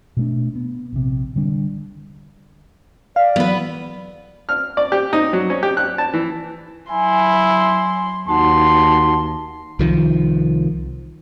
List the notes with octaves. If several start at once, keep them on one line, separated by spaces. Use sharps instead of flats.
B2 A3 D4
B3
A#1 C3
D3 G3 D4
D5 F5
E3 F#3 B3 B4
F6
D5
G4
D#4
F#3
C#4
G4
F#6
A5
E3
F#3 E4 G#5 C6
D#2 D#4 F#4 F#5 A5 C6
C2 D#3 F3